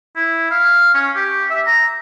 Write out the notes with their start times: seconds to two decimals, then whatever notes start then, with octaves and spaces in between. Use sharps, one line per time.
0.16 E4
0.51 F5
0.94 C#4
1.15 G4
1.50 E5
1.66 A#5